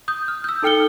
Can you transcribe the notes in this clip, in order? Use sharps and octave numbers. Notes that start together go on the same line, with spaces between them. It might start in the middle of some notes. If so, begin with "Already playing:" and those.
D#6 G6
F6
E6 G6
D#4 A4 G5 F6 C#7 G7